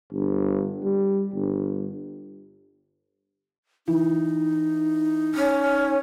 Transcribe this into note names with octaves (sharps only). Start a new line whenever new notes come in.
G1
G3
G1
E3 D#4
C#4